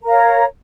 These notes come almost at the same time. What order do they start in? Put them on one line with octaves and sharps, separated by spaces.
A#4 A#5 F5 C#5